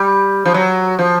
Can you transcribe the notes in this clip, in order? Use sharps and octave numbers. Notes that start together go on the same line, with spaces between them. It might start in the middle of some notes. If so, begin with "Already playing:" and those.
Already playing: G3
F3
F#3
F3